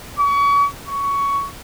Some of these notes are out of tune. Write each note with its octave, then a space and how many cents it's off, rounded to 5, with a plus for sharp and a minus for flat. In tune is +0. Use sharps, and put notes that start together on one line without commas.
C#6 +35
C#6 +15